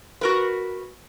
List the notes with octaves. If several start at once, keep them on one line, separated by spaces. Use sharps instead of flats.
F#4 A#4 B4